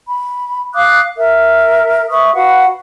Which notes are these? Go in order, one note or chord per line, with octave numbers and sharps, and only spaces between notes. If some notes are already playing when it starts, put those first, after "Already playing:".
B5
F5 D6 D#6 F#6
A#4 E5
B4 E5 C#6 D#6
F#4 B4 F5 F#5